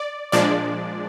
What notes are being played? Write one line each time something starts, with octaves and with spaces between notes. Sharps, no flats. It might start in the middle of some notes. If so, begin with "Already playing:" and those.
Already playing: D5
A#2 F3 G#3 D4 D5